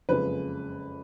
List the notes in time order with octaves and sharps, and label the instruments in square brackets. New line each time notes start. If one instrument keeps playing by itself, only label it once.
[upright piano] F#1 F2 C#3 G#3 B4